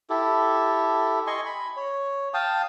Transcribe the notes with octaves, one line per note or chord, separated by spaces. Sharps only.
E4 G4 A4
D#5 G#5 C6 C#6
B5
C#5
F5 G5 A5 D#6